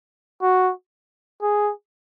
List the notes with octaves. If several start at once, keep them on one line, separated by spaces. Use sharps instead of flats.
F#4
G#4